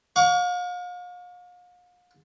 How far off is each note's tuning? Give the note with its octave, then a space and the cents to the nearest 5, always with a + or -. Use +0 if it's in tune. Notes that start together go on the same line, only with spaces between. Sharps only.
F5 +40 C#6 +35